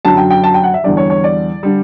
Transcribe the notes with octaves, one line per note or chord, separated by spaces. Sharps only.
F#2 D3 F#3 A5
G5
G5
A5
G5
F#5
E5
E2 D3 G3 D5
C#5
C#5
D5
D3 G3